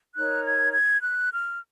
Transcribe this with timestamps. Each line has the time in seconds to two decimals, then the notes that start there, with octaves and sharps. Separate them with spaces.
0.16 D#4 A#4 C#5 F#6
0.45 G#6
0.74 G#6
1.03 F#6
1.32 F6